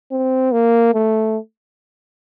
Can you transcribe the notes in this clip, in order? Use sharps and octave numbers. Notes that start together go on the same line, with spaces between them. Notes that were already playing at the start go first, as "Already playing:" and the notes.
C4
A#3
A3